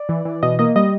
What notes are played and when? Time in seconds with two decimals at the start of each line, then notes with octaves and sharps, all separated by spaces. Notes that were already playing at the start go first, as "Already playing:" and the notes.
Already playing: D5
0.09 E3
0.25 E3
0.43 B2 D#5
0.59 A#3 D#5
0.76 G3 D#5